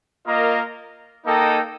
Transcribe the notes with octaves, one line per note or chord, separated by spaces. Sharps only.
A#3 F4 A#4 D#5
A#3 D#4 A4 D#5 G5